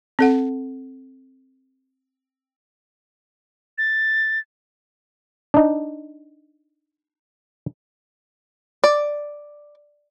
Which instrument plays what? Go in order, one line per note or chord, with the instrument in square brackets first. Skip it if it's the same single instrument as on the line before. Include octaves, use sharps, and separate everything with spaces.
[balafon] C4 A4 F#5
[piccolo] A6
[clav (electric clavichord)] D4 D#4
[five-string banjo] D5